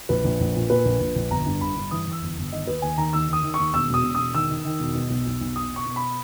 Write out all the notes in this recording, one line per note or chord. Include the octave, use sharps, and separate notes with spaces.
A#1 B4
A#1
A#1
A#2
A#2 B4
A#1
A#1
A#1
G1 A#5
G2
G1 B5
G2
E3 D#6
E3
E6
G1
G1
D#3 D#5
D#2 B4
D#2 G#5
D#3 A#5
D#2 E6
D#3 D#6
D#3
D#2 C#6
E1 E6
E1 D#6
E1
E1 D#6
D#3 E6
D#3
D#3
E1
B2
B1
B1
B1
B2 D#6
B2
C#6
B2
B5